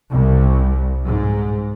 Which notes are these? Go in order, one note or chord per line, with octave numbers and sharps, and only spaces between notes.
C2
G#2